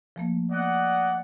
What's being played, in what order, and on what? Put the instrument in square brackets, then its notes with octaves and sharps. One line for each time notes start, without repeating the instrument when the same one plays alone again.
[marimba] F3 A3 A#3
[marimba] B3 [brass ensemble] D5 D#5 F#5